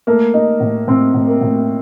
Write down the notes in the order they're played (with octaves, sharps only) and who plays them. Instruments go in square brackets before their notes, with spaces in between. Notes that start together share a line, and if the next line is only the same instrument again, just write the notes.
[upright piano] A3 [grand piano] A#3
[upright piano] D#4
A2
[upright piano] A2 [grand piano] C4
[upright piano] A2
[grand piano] A#3
[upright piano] A2